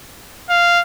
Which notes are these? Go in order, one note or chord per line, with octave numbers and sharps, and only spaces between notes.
F5